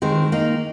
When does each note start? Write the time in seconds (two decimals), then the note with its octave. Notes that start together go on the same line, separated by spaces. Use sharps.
0.02 D#3 G#3 C4
0.32 A#3 D#4